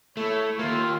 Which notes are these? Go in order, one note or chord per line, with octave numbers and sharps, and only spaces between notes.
A3 E4 C#5
D#2 A#3 F4